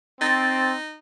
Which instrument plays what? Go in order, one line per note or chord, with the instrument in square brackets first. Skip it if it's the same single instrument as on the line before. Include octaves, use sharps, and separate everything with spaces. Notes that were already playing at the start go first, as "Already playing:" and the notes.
[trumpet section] C4 [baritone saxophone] D#4 [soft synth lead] A6